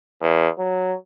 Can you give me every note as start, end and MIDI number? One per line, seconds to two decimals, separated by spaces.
0.22 0.49 40
0.59 0.95 54